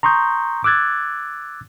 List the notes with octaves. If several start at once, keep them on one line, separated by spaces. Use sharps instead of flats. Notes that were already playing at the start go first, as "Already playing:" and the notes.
A#5 C6 C#6 D#6 G6
D6 E6 F#6 G#6 A6